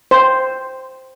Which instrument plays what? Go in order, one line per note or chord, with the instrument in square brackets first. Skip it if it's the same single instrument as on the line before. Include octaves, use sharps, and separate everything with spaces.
[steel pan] C5